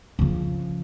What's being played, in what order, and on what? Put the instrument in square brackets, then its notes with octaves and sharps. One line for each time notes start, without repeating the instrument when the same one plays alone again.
[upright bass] C#3 F3